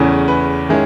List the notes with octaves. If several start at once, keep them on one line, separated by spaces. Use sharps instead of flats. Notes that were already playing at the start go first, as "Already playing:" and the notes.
Already playing: E2 C#3 E3 A3 C#4
B4
D#3 G#3 C#4 E4